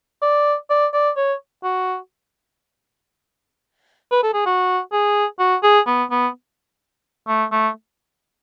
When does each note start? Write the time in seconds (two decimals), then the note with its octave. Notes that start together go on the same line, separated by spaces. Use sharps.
0.22 D5
0.70 D5
0.93 D5
1.17 C#5
1.63 F#4
4.11 B4
4.23 A4
4.34 G#4
4.46 F#4
4.92 G#4
5.39 F#4
5.63 G#4
5.87 B3
6.11 B3
7.28 A3
7.52 A3